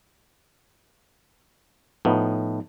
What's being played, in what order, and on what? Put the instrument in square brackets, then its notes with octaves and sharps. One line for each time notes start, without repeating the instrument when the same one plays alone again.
[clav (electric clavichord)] A2 [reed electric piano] F3 B3 D#4